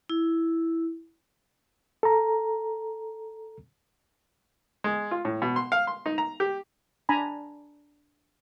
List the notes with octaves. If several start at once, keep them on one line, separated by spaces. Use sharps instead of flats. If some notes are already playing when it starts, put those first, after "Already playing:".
E4
A4 A#5
G#3
F4
A2
B2
C6
F5
C6
D#4
A#5
G4
D4 D5 G#5 A#5 B5